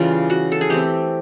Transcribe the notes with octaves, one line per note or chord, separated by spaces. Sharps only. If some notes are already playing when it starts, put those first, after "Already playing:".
Already playing: C#3 E3 G3 F4
F#4
A4
G#4
E3 A3 C4 G4